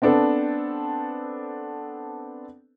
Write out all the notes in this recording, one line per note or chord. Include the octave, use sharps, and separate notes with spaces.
B3 C4 D4 A4 B4